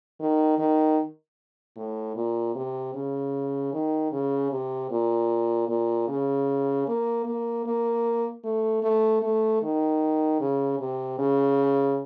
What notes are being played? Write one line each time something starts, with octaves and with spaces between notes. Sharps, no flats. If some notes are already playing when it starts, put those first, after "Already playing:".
D#3
D#3
A2
A#2
C3
C#3
D#3
C#3
C3
A#2
A#2
C#3
A#3
A#3
A#3
A3
A3
A3
D#3
C#3
C3
C#3